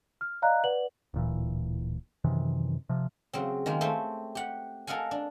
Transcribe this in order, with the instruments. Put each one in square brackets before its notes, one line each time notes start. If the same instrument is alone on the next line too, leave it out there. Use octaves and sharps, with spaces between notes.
[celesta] F6
D5 D#5 F5 A#5 F#6
B4 D5 F#5 F#7
[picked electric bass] D1 A#2 E3
F#2 C3 D#3 E3
C3 F3
[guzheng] C#3 F#3 C4
D#3 G#3 A#3
A3 C4 G4 C5 C#5
G4 F#5
A4 A#4 D#5 F5 F#5 G#5
D4